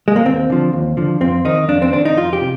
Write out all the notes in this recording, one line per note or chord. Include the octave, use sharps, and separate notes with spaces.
G#3
A#3
D#2 C4
D3 F3
D#2
D3 F3
F2 C4
D#3 D#4
F2 D4
C4
D#3 D4
D#4
F2 F4
G4
C3